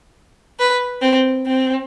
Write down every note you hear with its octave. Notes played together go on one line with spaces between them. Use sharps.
B4
C4
C4